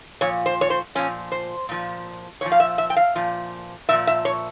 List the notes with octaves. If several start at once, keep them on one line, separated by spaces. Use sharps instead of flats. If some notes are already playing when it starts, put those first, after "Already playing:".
A#2 F3 C#5
C5
C#5
C5
A#2 F3 C#4
C5
A#2 F3
A#2 F3 C#5
F5
E5
E5
G5
F5
A#2 F3
A#2 F3 E5
E5
C#5